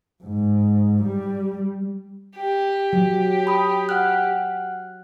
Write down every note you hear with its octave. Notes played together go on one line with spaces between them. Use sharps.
G#2
G3
G4
F#3
A5 B5 D#6
F#5 F6 F#6